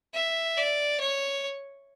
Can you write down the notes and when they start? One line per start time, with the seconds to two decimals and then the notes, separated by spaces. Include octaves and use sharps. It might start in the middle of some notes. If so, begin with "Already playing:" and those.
0.14 E5
0.57 D5
1.01 C#5